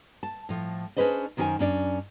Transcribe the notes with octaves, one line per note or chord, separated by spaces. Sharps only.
A5
A2 F3
C#4 D4 G#4 B4 C5 D#5
F#2 D#3 C#4 G4 C5 G#5
F#2 C#4 D4 D5